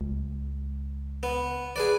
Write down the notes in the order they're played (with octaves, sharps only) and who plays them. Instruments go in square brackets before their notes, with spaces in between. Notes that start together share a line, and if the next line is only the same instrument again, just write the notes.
[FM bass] C#2
[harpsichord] B3
G#4 B4 D5